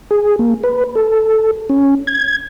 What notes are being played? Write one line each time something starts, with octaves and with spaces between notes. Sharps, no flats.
G#4
A#3
B4
A4
C#4
G#6